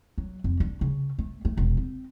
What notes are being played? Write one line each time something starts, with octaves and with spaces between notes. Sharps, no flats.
F#3
F2
D4
C#3
A3
A3
E1
C4